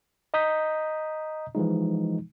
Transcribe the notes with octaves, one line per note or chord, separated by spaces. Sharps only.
D#5 A#5 D#6 G6 B6
E3 F3 G#3 D#4